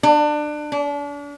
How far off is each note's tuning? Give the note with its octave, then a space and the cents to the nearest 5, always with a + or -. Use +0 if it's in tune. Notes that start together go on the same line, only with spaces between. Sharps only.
D4 +25
D4 -35